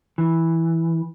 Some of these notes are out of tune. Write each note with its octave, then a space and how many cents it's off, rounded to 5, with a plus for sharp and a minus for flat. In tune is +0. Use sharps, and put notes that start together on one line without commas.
E3 -5